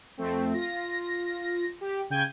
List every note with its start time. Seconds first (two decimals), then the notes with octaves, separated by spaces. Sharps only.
0.17 F2 A3 C4
0.54 F4 A#6
1.81 G4
2.10 C#3 G5 G6 G#6 D#7